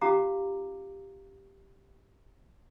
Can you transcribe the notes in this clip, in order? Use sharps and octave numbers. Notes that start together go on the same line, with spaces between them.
C#4 F4 G4 F5 A#5 D6